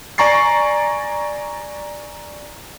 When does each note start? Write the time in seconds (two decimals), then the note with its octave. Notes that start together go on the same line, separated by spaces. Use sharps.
0.18 D5 G#5 A#5 C#6 A6 C7